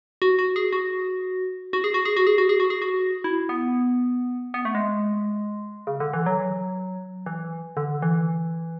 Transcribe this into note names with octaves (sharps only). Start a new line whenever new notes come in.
F#4
F#4
G#4
F#4
F#4
G#4
F#4
G#4
F#4
G#4
F#4
G#4
F#4
G#4
F#4
E4
B3
B3
A3
G#3
C#3
D3
E3
F#3
E3
D3
E3